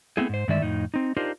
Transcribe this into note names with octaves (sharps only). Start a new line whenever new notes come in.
A3 B3 C4 E4 G#4
G#2 C5
G2 D3 D#3 G#3 D5 E5
F2 A2 D#4
C4 D#4
D4 D#4 F4 G4 A#4 C5